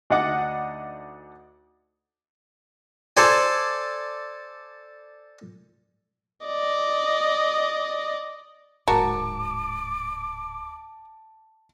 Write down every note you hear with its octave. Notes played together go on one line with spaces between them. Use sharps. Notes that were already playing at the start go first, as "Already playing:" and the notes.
D2 D4 D#4 D#5 F#5 D6
A4 C5 D5 G#5
D5 D#5
D1 G#2 F#4 A#4 A5 D6